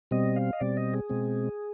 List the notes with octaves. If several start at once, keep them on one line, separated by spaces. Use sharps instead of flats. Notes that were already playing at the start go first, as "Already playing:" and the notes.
B2 G3 C4 D#5
F5
D#5
B2 G3 C4 D5
D#5
G#4
B2 G#3 C4